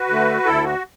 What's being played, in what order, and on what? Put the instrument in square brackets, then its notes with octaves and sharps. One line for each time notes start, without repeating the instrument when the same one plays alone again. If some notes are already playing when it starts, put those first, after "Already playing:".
Already playing: [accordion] F#4 B4
D3 A3
D2 E4 A4
F#4